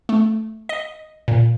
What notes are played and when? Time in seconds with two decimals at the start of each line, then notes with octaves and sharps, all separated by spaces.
0.09 A3
0.69 D#5
1.28 A#2